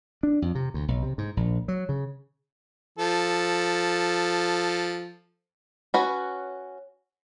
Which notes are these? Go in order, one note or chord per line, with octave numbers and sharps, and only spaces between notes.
D4
F2
C3
D2
B1
C3
G#2
A#1
F#3
C#3
F3 A4
C#4 F#4 B4